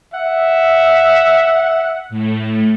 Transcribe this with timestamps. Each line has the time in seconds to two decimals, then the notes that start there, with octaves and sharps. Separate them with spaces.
0.14 E5 F#5
2.09 A2 A3